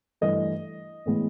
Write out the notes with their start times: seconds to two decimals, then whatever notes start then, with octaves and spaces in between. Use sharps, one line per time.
0.21 G2 E3 A3 D#5
1.06 A2 E3 G#3 B3